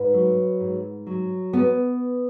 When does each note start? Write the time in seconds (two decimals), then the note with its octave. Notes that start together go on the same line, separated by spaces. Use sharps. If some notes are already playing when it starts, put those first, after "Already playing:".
Already playing: G#2 B4
0.13 F#3
0.60 G#2
1.07 F#3
1.53 B3